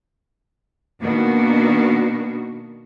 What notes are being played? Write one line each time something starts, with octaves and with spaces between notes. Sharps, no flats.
B2 D#3 A#3 D4 F#4